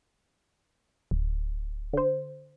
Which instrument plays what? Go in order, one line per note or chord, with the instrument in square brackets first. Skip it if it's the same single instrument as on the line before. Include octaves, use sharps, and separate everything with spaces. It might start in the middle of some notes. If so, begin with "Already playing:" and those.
[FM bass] D1
[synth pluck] D3 C5